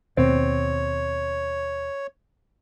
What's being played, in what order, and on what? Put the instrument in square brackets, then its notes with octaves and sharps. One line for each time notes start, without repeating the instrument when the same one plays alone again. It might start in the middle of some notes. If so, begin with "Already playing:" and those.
[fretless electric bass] D#2 B2 [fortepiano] C4 [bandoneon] C#5